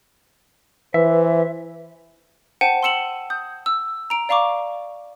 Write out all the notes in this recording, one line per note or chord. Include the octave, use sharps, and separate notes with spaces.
E3 B4 C5 E5
C5 F#5 G5 A5 D#7
C6 E6 C#7 E7 F#7
D#6 G6
E6
A#5 D7
D5 F5 A#5 C#6 D6